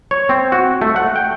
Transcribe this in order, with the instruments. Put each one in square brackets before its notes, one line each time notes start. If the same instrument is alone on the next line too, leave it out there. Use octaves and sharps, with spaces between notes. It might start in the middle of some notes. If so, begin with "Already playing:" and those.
[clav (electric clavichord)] C#5
C4
F#4
A3
F#5
G5